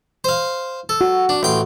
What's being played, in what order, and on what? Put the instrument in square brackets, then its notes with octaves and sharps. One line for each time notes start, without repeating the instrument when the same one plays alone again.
[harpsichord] C5 F5
A4
[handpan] F#4
[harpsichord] D4
A1 G5 C6